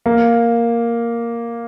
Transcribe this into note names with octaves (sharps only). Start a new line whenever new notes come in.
A#3